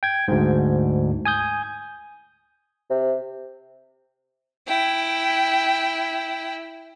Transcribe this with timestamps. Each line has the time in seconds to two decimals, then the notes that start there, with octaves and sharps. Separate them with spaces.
0.03 G5 G#6
0.28 D2 G#2
1.25 G#5 D#6 G6
2.90 C3
4.67 E4 G5